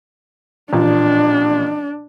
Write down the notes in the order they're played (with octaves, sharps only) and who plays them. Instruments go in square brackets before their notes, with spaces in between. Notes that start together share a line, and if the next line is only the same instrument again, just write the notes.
[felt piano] A1 A#2 F3 [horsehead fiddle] D4